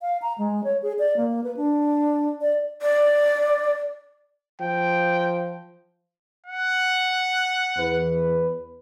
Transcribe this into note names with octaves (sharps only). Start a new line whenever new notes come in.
F5
A#5
G#3
C#5
G#4
D5
A#3
B4
D4
D5
D5
F3 G5
F#5
E2 B4